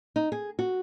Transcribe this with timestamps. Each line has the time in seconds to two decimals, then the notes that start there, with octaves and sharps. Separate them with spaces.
0.16 D#4
0.32 G#4
0.59 F#4